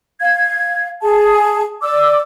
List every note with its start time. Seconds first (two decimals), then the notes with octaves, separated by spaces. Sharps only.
0.20 F5 G#6
1.02 G#4 A5
1.82 D5 D6 E6